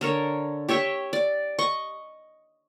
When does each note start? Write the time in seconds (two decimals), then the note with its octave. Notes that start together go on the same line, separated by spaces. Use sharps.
0.01 D3 A#4 C#5
0.69 G4 C#5 E5 C#6
1.13 D5
1.59 D#5 C#6